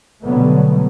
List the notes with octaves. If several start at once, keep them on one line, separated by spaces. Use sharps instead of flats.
B2 D3 F#3 G3 A3 B3